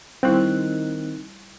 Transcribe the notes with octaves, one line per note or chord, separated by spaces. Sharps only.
D#3 G3 C4 E4 F#6